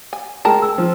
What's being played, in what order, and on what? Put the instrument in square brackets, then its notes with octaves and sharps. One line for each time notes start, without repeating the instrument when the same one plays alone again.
[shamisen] G#5
[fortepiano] G#3 [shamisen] A#4 A5 [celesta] G5 A#5
[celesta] E6
[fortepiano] F3 [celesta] C5